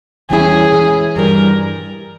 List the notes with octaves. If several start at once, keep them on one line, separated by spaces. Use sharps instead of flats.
E2 E3 G3 C#4 E4 G#4
E3 G#3 C#4
G2 E3 G3 A#4